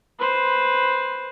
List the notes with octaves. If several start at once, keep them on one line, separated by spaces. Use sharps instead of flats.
B4 C5